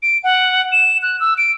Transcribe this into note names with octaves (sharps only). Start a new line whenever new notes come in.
D7
F#5
E7
F#6
E6
D7